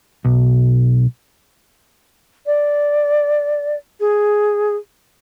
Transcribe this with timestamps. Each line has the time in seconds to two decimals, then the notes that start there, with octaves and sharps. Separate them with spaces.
0.24 B1
2.46 D5
4.00 G#4